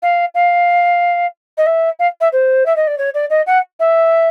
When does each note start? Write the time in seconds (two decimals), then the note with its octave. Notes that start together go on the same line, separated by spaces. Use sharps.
0.03 F5
0.35 F5
1.58 D#5
1.66 E5
1.99 F5
2.21 E5
2.32 C5
2.66 E5
2.76 D#5
2.87 D5
2.98 C#5
3.14 D5
3.30 D#5
3.47 F#5
3.80 E5